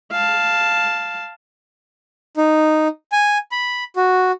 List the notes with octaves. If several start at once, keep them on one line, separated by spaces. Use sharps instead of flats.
F5 A5
D#4
G#5
B5
F#4